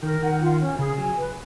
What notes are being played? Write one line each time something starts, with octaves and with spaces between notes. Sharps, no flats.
D#3 A#4
D#3 F#5
F4
C#4
C#3 G#4
F#3 G#5
B4